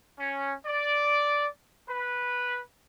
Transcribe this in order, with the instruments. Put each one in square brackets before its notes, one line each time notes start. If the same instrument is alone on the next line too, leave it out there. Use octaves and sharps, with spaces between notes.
[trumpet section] C#4
D5
B4